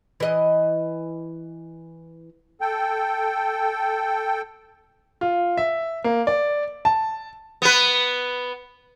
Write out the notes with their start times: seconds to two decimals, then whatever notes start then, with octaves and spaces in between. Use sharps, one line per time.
0.20 E3 D#5
2.61 A4 G5
5.21 F4
5.57 E5
6.04 A#3
6.27 D5
6.85 A5
7.62 B3 B4